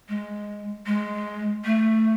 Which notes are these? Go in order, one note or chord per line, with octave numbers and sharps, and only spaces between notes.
G#3
G#3
A3